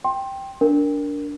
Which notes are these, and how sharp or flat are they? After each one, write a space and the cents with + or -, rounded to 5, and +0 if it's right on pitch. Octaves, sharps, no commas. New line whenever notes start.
G5 +0 C6 +25
D4 -20 A#4 +0